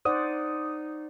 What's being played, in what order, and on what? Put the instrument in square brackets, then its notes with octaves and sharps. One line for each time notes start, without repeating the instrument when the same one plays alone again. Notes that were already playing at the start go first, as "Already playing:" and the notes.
[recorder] D#4 [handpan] C5 D5 F#5 [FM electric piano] D#6